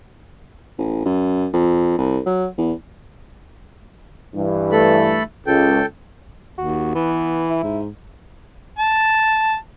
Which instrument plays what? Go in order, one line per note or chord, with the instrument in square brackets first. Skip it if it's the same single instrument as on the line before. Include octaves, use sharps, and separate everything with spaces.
[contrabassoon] A1
F#2
F2
C2
F#3
E2
[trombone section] G2 E3
[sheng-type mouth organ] A3 A4 B5
[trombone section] C#2 [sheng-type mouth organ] A4 G5
[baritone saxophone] D#2 [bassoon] F#4
[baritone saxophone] E3 [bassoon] B3
[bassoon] E4
[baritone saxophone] G#2
[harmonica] A5